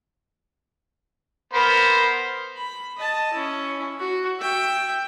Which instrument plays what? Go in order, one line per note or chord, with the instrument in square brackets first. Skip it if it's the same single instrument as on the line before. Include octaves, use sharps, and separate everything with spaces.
[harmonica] B3 A#4 C5
[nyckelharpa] B5
D#5 A5
C#4 E4
F#4
E5 G5